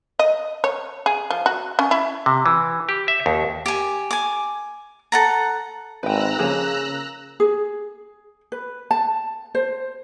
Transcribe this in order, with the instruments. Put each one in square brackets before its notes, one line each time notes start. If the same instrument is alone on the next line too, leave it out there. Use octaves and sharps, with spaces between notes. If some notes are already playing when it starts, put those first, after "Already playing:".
[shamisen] D#5
C#5
G#4
F3
F#4
C#4
E4
[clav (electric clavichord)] C3
E3
G4
E5
D#2
[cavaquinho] G4 G#5
G#5 D6
A4 F#5 A#5
[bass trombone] G#1 [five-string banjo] B4 G5 [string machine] A#5 E6 F#6
[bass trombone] C#3 [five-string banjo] F3 A#3 G#4
[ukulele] G#4
B4
A5
C5